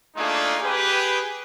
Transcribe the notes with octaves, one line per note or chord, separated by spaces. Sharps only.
A3 A#3 D4 D#4 F4 G#4
G4 G#4 B4